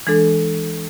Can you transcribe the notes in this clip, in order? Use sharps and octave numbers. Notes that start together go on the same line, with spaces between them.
E3 G#3 D4 A4